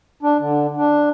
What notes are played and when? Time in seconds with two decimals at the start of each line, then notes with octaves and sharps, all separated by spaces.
0.23 D4
0.39 D3
0.76 D4